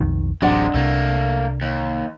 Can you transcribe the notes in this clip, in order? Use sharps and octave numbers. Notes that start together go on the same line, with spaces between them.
B1 F2 D#3
D1 A1 C3 F#3 G#3 D4 D5 F#5
C2 C3 A3 A#3
D#2